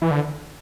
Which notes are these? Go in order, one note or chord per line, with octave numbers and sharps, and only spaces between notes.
E3
D3